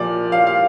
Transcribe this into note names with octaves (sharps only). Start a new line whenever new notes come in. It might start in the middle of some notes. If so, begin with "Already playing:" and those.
Already playing: A#2 F3 A#3 D5
F5
F5